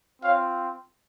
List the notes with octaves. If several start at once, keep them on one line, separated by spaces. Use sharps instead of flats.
C4 F4 C#5 F5